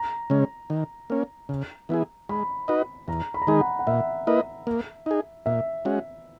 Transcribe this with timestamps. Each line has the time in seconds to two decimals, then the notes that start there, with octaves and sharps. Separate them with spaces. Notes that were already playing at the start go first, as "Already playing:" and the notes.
Already playing: A#5
0.30 C#3 G#3 C#4
0.70 D#3
1.10 A#3 C#4
1.49 C#3
1.89 E3 B3 E4 G#4
2.29 G#3 B5
2.68 D#4 F#4 B4 D#5
3.08 E2 A#5
3.34 B5
3.42 A#5
3.47 D#3 G#3 D#4 G#4 B5
3.60 F#5
3.79 F#5
3.87 A#2 E5
4.27 A#3 E4 B4 D#5
4.67 A#3
5.06 D#4 G#4
5.46 A#2 E5
5.85 G#3 C#4 F#4